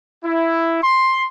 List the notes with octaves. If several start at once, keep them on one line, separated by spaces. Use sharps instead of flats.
E4
C6